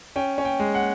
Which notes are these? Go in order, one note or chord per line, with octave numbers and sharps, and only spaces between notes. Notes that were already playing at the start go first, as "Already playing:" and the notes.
C#4 G5
C#4
G5
G#3
F#5